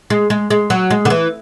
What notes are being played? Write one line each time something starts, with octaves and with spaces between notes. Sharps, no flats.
G#3
G#3
G#3
F#3
G#3
D3
E3